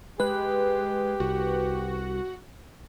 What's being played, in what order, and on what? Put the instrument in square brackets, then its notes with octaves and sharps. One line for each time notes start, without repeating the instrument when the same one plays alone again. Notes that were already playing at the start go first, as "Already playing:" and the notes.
[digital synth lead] G#3 [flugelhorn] G4 [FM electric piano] B4 F#6
[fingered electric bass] C2 [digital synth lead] F#4